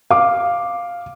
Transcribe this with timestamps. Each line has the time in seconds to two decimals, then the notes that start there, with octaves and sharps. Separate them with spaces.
0.10 F5 D6